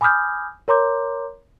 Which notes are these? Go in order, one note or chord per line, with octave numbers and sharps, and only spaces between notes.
G#5 B5 D6 D#6 F6 G6
A#4 C#5 A#5 C6 D6 G6